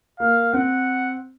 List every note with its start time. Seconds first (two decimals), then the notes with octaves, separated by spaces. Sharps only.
0.20 A#3 F5
0.54 C4 F#5